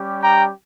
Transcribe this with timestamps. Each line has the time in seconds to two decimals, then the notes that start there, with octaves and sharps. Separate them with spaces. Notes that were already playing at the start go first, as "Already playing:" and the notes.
Already playing: G3 C#4 G4
0.22 G5 A#5